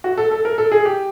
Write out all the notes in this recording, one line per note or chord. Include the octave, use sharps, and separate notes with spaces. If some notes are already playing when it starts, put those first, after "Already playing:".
F#4
A4
A4
A#4
A4
G#4
G4